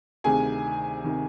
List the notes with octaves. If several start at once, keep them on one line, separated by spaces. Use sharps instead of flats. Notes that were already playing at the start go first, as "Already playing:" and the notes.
D2 C3 D#3 G#4 G#5
C3 D#3